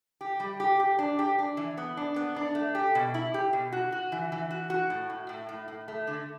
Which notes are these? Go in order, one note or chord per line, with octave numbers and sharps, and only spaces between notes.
G4
G3
G4
G4
D4
G4
D4
E3
B3
D4
B3
D4
A3
G4
B2
E4
G4
B2
F#4
F#4
E3
E3
F#4
F#4
A2
A2
A2
A2
A2
A3
D3